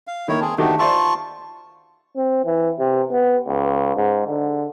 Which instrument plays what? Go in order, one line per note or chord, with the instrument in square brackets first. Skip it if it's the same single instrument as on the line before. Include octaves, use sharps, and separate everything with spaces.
[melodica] F5
[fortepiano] D#3 A#3 [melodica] E4 C#5
[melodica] C4 G#4 [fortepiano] A5
[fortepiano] D#3 F#4 G4 [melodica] A3 B3 D4
[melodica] F4 A5 C#6 [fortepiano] C5 D5 E5
[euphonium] C4
E3
C3
B3
C#2
G#2
D3